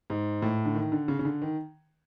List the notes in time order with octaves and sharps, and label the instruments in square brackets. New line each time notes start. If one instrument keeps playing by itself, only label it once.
[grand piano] G#2
A2
D3
D#3
D3
C#3
C#3
D3
D#3